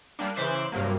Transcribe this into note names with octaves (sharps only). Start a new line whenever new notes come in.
G3 A#3 D4
C#3 E3 C5 E5 D6 F#6
G2 C3 F#3 A#3